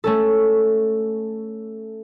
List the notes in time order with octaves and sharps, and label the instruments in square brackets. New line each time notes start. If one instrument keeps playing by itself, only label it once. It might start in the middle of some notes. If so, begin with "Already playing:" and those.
[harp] A3 C#4 A4